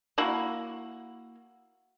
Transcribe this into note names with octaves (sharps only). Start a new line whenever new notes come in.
A#3 E4 F#4